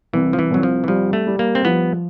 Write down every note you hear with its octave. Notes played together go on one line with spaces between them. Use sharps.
C2 E3
F3
E3
C2 F#3
F3
E3
F3 G3
A3
G3
A#3
C4
F3 B3